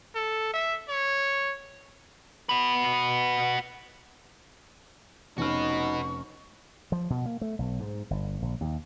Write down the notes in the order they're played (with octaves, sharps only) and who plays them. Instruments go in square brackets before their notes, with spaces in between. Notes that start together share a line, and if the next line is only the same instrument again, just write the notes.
[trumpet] A4
E5
C#5
[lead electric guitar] F#4 B4
[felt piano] F1 C#4 F6 [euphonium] D#4 [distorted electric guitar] F#4 B4 [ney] C#6
[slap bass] F3
B2
A#3
A3
B1
G#2
G1
A#1
D#2